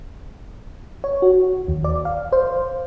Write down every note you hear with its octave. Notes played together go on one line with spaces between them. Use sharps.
C#5
F#4
D#2
D5
F5
C5